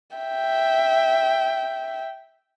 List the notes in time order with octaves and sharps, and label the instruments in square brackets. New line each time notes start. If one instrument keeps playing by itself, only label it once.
[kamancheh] E5 G5